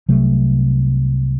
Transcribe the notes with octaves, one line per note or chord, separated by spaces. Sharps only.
C2 C3 F#3 A3